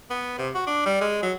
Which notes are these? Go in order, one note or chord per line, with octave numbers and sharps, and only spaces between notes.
B3
C3
F#4
D4
G3
G#3
F#3